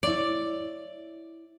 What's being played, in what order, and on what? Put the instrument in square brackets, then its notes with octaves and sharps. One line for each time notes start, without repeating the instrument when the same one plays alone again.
[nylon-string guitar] E4 C#5 [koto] D5